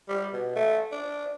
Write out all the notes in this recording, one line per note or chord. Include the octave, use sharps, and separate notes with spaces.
G3
B2
A3
D4